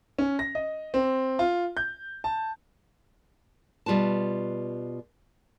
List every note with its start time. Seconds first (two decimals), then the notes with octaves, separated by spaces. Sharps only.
0.18 C#4
0.39 A#6
0.55 D#5
0.94 C4
1.39 F4
1.77 G6
2.24 A5
3.86 B2 G3 F4 B4 A5